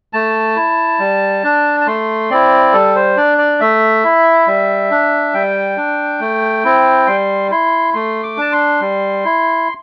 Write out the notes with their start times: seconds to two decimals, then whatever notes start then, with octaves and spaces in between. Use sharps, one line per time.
0.13 A3 A5
0.56 E4
0.99 G3
1.44 D4
1.81 A5
1.86 A3 C6
2.30 C4 E4 D5
2.73 G3 A4
2.95 C5
3.17 D4 D5
3.38 D5
3.60 A3 E5
4.04 E4
4.47 G3
4.91 D4
5.34 G3 G5
5.77 D4
6.20 A3
6.64 C4 E4
7.07 G3 C6
7.51 E4 C6
7.94 A3 C6
8.23 D6
8.37 D4 A5
8.52 C6
8.81 G3
9.25 E4